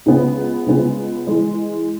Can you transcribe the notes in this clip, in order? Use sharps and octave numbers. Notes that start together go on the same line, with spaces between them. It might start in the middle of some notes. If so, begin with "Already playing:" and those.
C#2 C#3 G#3 B3
C#2 C#3 G#3 B3
E3 G#3